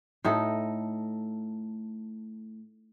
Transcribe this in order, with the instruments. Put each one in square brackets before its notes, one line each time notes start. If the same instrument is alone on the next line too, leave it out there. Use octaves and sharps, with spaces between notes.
[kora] A2 D#4 A4